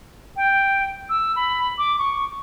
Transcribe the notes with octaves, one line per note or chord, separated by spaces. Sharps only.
G5
E6
B5
D6
C#6